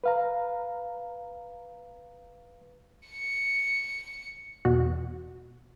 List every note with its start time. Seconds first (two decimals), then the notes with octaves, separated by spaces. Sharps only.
0.04 B4 F5 A#5
3.07 C#7
4.65 E2 B2 F#4